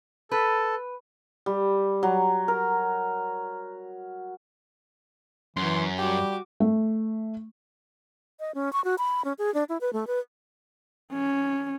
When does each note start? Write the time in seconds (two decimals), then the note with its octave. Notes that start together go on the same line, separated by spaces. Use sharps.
0.31 A4 B4
1.46 G3
2.03 F#3
2.48 A#4
5.57 F#2 E3 C6
5.99 G3 F#4 G4 D6
6.60 A3
8.40 D#5
8.55 C#4
8.73 C#6
8.84 F#4
8.98 B5
9.25 C#4
9.38 G#4
9.54 D4
9.69 E4
9.81 B4
9.93 A3
10.07 B4
11.13 C#4